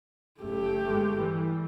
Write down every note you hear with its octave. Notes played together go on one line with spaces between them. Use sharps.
F#1 A3 G4
G1 G#3
E3 G3